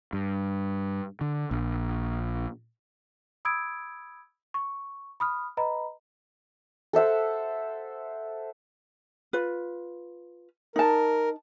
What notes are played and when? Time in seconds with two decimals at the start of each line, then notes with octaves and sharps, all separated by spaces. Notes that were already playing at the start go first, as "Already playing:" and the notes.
0.13 G2
1.21 D3
1.51 A#1
3.45 B5 D#6 E6 G#6 D7
4.54 C#6
5.20 B5 D#6 F6
5.57 B4 D#5 A#5 B5
6.93 A4 C5 E5 F#5
9.33 F4 B4
10.76 D#4 A#4 A5